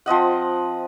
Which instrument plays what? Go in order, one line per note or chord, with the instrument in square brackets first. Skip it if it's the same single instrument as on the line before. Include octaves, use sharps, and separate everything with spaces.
[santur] F3 C4 D#5 F#5